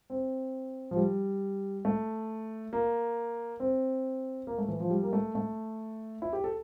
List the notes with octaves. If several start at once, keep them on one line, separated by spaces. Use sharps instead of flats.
C4
F3
G3
A3
A#3
C4
A#3
A3
E3
F3
G3
A#3
A3
A3
E4
G4
A4